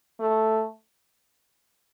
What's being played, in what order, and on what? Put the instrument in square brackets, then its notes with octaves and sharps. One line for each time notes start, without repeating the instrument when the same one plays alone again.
[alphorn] A3